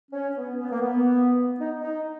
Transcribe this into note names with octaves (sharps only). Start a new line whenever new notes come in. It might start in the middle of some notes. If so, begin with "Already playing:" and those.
C#4
B3
B3
A#3
B3
D#4
D#4